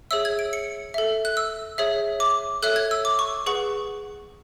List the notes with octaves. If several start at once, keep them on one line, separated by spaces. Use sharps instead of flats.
G#4 C#5 E5 E6
G#6
D7
C#7
A4 E5
F#6
E6
G#4 C#5 E5
D6
A4 C#5 E5 F#6
G#6
E6
D6
C#6
G#4 B4 F#5 C#6